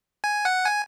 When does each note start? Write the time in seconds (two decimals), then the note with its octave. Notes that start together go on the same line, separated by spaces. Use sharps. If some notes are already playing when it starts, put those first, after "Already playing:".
0.24 G#5
0.45 F#5
0.65 G#5